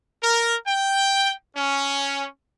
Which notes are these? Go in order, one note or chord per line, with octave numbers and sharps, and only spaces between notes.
A#4
G5
C#4